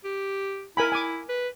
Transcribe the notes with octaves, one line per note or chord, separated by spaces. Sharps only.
G4
E4 A#4 G#5 B5
G#5 D6
B4